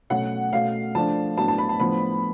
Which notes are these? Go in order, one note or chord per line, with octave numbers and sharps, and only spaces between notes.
B2 F#3 A3 C#4 F#5
B2 A3 C#4 F5
F3 A3 D4 A5
A2 F#3 B3 D4 A5
A5
B5
A5
A2 F3 B3 D4 B5